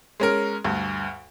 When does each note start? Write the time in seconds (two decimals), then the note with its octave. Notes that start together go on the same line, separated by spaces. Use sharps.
0.20 G#3 C#4 A#4
0.65 D2 G2